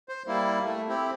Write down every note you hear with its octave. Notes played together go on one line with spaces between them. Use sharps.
C5
G3 A#3 E4
A3
C4 E4 G4